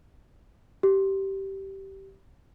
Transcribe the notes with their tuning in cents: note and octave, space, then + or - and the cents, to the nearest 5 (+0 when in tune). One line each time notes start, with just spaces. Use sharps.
G4 -15